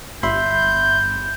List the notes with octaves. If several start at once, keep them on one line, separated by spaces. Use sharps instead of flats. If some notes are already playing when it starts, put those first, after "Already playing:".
G1 E5 B5 C6 G6